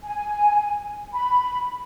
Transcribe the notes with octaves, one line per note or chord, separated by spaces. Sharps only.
G#5
B5